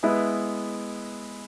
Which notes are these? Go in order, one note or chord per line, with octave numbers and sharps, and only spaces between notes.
G#3 B3 E4 B4